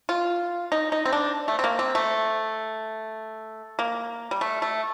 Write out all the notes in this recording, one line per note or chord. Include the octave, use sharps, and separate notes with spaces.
F4
D#4
D#4
C4
D4
A3
C4
A#3
C4
A3
A#3
G3
A3
A3